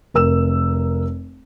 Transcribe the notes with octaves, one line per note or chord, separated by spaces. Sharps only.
F1 A#4 E6 E7